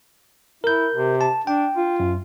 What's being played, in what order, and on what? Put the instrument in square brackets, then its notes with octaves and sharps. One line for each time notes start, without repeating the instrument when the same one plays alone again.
[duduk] E4 [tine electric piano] A#4 G6
[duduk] C3
[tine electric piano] A5
[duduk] D4 [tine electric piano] G5
[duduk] F4
[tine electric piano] F#2